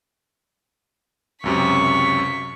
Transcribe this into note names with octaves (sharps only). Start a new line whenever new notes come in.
C#2 F#2 C3 C#6 B6